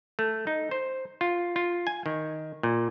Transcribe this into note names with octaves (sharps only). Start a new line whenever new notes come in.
A3
D#4
C5
F4
F4
G#5
D#3
A#2